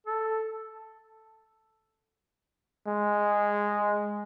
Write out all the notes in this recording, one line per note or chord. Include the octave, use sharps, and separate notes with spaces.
A4
G#3